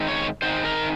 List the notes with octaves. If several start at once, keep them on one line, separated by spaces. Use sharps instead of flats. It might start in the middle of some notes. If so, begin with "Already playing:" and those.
Already playing: D#3 G#3 C4 D#4
C#5
D#3 G#3 C4 D#4 C5
A#4